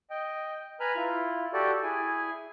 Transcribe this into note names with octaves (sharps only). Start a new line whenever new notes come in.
D#5 G5
B4 G#5 A#5 B5 F6
E4 F4
F#4 G4 A4 D5
E4 G#4 G#5